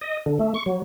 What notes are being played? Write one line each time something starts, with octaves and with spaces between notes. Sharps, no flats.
D#5
D3
A3
C#6
F#3